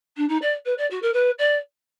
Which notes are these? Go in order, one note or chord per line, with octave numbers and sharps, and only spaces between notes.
D4
D#4
D5
B4
D5
F#4
A#4
B4
D5